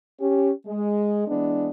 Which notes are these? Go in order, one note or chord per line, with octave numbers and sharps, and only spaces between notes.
C#4 G4
G#3
E3 G#3 B3 D4